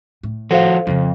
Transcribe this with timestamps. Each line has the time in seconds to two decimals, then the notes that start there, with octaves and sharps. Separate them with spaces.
0.23 A2
0.51 F3 F#4 A4 C5 F5
0.87 F2 C#3 F4